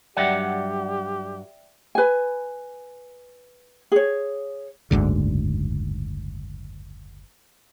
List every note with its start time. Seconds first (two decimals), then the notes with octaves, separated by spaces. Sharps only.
0.17 G2 F#3 G4 D5 E5 F#5 G5
1.95 B4 G#5
3.92 G#4 C#5
4.91 F#1 D2 G#2 D3